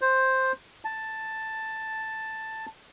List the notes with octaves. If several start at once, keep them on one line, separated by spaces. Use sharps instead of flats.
C5
A5